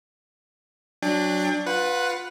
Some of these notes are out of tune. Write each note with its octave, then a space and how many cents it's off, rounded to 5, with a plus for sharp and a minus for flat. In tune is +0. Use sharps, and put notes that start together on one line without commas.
F#3 +0 D4 +0 G5 +45
F4 +25 B4 +0 F#5 +0